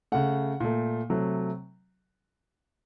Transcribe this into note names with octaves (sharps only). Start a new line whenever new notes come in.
C#3 A3 F#5
A#2 A3
C3 F#3 A3